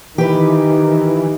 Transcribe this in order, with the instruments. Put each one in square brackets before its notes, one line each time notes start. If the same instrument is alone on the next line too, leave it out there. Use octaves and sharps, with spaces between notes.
[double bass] D#3 [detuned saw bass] E3 [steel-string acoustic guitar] G4 B4